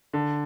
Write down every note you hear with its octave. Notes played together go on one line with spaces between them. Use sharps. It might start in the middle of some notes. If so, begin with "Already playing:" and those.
D3